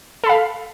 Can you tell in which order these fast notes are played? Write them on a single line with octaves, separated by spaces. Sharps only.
A4 B5 F5